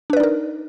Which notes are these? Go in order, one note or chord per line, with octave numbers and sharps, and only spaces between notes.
D4 D#4 A#4 B4 D5